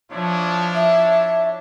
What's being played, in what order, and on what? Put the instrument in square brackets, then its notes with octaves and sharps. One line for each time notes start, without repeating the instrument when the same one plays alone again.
[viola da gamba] F3 [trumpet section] D4 E4 C#5
[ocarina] E5